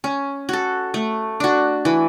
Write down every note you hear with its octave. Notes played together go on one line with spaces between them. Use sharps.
C#4
F#4 A4
A3
D4 F#4
E3